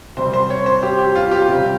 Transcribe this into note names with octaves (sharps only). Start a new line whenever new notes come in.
C3 G3 C4 C5
C5
C#5
C5
G4
G4
F4
G4
C3 G3 C4